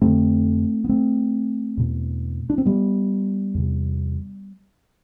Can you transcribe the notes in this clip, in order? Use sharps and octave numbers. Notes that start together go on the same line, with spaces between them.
F2 D3 A3 C4
B3
A3 C4
E2 B2
D4
C4
G3 B3
E2 C3